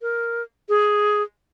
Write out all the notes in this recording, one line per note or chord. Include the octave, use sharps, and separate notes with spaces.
A#4
G#4